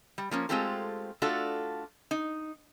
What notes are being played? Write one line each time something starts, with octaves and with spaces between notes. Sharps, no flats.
G3
F3 A#3 C#4
G#3 A3 C4 F4 G4 A4
A3 D4 F4 F#4 A4
D#4